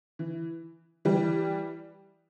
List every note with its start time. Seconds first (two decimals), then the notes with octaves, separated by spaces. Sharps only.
0.19 E3
1.05 E3 G3